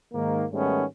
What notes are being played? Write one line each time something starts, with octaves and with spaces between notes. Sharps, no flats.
G#2 D#3 A#3
G#2 D#3 G3 A3 B3 C#4